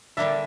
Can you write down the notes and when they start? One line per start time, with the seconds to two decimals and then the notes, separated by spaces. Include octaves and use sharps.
0.17 D3 G3 A#3 D4 E5